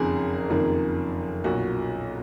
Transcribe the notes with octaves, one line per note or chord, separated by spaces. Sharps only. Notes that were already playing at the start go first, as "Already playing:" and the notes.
Already playing: F#1 F2 D#3 G#4 A#4
F#1 F2 D#3
B1 A#2 F#4